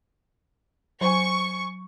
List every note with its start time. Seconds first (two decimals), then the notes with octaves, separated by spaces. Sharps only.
1.01 F#3 C5 G#5 C#6